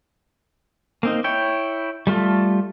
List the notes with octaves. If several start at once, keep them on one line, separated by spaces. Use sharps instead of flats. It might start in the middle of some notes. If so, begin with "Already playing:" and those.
A#3 C4 D#4
E4 C#5 G5
G3 A3 F4 A4